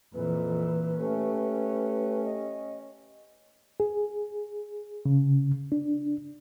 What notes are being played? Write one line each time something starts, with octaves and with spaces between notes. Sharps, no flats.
F2 A#2 E3 B4
A3 C#4 G4
D#5
G#4
C#3
D4